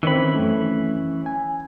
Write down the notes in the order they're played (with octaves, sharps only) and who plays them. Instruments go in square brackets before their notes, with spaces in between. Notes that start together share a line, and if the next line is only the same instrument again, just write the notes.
[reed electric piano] D#3 C4 [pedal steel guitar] E3 C#4 B5
[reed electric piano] F#2 A3
G#5